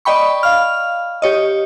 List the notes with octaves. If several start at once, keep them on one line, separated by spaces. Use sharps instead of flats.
D5 D#5 G5 B5 C#6
F5 F6
G4 C#5 D#5